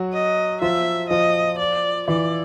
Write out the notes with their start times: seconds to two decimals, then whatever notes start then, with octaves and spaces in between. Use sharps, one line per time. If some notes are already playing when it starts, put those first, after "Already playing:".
Already playing: F#3 F#4
0.13 D#5
0.62 F3 F4 E5
1.10 F3 F4 D#5
1.59 D5
2.08 E3 E4 D5